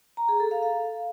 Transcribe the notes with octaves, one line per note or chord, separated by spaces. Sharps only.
A#5
G#4
A4
F5
F5